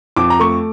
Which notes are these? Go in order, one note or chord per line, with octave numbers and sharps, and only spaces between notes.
F2 D6
A#5
A3 C#6